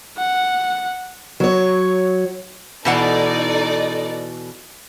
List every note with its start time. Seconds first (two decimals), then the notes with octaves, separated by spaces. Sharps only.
0.18 F#5
1.40 F#3 C#5
2.85 B2 E3 D#4 A4 D5 F#5